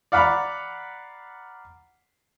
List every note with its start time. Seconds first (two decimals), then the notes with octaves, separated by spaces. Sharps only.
0.12 D5 F5 F#5 A#5 B5